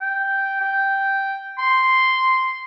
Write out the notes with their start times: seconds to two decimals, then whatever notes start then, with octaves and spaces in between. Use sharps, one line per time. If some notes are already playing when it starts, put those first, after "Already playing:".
0.01 G5
0.61 G5
1.58 C6